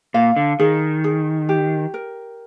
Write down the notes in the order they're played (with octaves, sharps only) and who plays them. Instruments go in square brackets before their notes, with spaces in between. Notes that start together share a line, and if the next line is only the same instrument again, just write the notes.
[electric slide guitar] A#2 [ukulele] F5
[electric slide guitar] D3
[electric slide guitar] D#3 [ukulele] G#4
[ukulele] G#4
G4
A#4